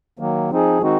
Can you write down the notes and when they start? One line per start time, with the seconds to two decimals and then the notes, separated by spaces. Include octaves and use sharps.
0.19 D#3 F#3 A#3
0.51 F3 C4 D#4 G#4
0.81 D#3 G#3 C4 D#4 F#4